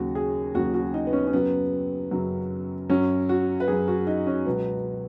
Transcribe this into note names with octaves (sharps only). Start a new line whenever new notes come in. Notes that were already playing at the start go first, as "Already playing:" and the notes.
Already playing: D#2 C#3 F#3 F#4
G#4
D#2 C#3 F#3 F#4
F#4
D#4
B3
C#4
C#4
F#2 C#3 F#3 B3
F#2 C#3 F#3
F#2 F#3 C#4
F#4
B4
F#2 F#3 G#4
F#4
D#4
C#4
C#2 B2 F#3 B3